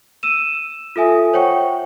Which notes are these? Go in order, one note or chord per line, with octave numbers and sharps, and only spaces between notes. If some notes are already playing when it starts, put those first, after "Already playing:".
E6 D#7 E7
F4 A4 E5 G#5 D#6
C5 C#5 F#5 G5 C#6